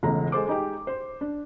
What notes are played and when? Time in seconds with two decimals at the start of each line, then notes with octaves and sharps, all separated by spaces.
0.03 E1 C#2 A3 A#5
0.32 G#3 A4 C5 D6
0.47 G#3 D#4 G4
0.87 C5
1.21 D4